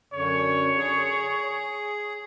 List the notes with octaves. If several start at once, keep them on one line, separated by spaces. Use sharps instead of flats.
F#2 D3 C#5
G#4